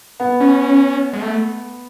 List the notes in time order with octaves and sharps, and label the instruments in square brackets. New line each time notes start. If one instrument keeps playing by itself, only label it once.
[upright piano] B3
[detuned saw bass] C#4
G#3
A3